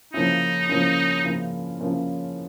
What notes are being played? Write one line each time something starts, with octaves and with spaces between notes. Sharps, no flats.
C#3 F3 A#3 C#4 D#4 E4
C#3 F3 A#3 C#4 E4
C#3 F3 A#3 C#4 E4
C#3 F3 A#3 C#4 E4